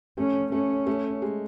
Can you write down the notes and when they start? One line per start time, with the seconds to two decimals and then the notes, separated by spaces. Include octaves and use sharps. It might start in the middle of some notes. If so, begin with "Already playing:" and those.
0.18 A3 C#4
0.52 A3 C#4
0.87 A3
1.22 G#3